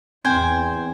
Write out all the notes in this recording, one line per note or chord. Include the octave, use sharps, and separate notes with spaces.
E2 C4 C5 G5 G#5